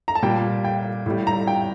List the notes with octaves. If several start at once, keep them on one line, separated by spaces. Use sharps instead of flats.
A#5
A5
A#2 G3 G5
G5
A2 G3
A#5
G5